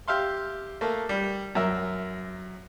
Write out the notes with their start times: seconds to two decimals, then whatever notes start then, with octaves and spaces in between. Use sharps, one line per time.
0.08 G4 E5 F5 C6
0.81 A3 A#3
1.09 G3
1.55 F#2 A#4 E5